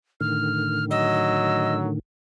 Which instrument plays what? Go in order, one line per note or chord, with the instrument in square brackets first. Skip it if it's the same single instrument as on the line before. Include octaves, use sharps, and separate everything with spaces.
[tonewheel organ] A2 D3 D#3 [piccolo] F6
[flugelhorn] F#3 [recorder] D#5 [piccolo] E6